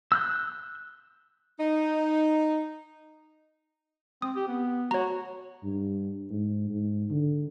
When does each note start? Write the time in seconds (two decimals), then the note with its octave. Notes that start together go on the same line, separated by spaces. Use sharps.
0.12 E6 F#6 G6
1.58 D#4
4.22 C4 D#6
4.36 G4
4.48 B3
4.91 F#4 C#5 A#5
5.63 G2
6.31 G#2
6.69 G#2
7.10 D3